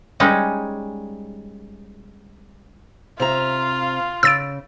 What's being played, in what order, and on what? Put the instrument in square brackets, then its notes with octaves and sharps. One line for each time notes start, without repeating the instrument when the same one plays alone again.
[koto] G3 G#3 C#4 D#4
[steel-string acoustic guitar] C3 E5 A#5 [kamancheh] F4 F5
[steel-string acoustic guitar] C#3 [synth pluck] E6 A6 D7